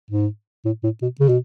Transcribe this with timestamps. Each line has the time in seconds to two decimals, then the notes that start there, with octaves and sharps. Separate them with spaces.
0.11 G#2
0.65 A2
0.84 A2
1.02 B2
1.20 C#3
1.29 B2